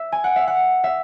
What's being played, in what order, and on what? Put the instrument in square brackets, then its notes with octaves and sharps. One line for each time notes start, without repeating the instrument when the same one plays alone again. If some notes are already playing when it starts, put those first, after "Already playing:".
Already playing: [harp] E5
G#5
F#5
E5
F#5
E5